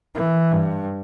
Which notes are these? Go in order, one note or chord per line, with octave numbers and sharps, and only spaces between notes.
E3
G2